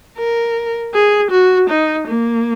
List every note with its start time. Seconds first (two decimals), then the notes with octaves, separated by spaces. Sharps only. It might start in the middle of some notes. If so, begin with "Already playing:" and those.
0.18 A#4
0.94 G#4
1.31 F#4
1.69 D#4
2.07 A#3